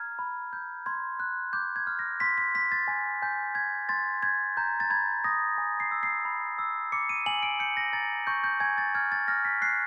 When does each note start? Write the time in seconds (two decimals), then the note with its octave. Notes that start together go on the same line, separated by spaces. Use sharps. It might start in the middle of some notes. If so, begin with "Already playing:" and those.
Already playing: A#5 F6 G#6
0.19 B5
0.53 G6
0.86 C6 G#6
1.20 F#6
1.53 D6 G6
1.76 G#6
1.87 F6
1.99 A#6
2.20 C6 B6
2.38 B6
2.55 C6 B6
2.72 A6
2.88 G#5 G#6
3.22 G#5 G6
3.55 G6 G#6
3.89 C6 A6
4.23 G6 G#6
4.57 A#5 G6
4.80 A6
4.90 B5 G#6
5.24 D#6 A#6
5.58 G#5
5.80 C7
5.91 E6
6.03 C7
6.25 B5
6.59 E6
6.92 D6 C#7
7.09 D#7
7.26 G#5 F#7
7.43 D7
7.60 G6 C#7
7.77 A#6
7.93 A#5 A6
8.27 C#6 G6
8.44 G6
8.60 G#5 G#6
8.78 A6
8.95 F6 G#6
9.12 A6
9.28 F6 A#6
9.45 B6
9.61 F#6 C7